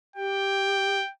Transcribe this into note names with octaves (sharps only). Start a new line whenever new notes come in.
G4 G5